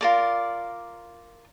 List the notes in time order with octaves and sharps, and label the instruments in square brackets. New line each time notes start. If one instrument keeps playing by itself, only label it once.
[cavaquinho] F4 A#4 D5